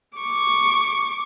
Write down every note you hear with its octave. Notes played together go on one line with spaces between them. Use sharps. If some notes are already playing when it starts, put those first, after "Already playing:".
C#6 D6